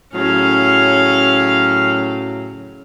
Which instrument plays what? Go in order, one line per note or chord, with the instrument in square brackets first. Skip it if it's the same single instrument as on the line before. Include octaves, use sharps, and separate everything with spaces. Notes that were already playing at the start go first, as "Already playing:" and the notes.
[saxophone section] A2 C#3 F#3 [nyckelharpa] C#4 F5